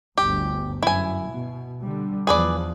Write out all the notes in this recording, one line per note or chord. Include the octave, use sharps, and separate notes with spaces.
G1 D2 G4
F#2 E4 G#5
B2
D3 G3
E2 F3 G#4 B4 D5